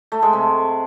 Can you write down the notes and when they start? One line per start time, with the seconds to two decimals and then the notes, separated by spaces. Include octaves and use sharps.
0.12 A3
0.22 G#3
0.33 C3